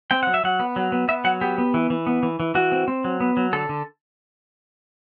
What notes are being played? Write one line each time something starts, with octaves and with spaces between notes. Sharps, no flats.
C4 G5
F#3 F#5
E5
F#3 F#5
B3
F#3
B3
B3 E5
F#3 F#5
B3 G4
B3
E3
E3
B3
E3
E3
E3 F#4
C4
C4
F#3
B3
F#3
D3 A4
D3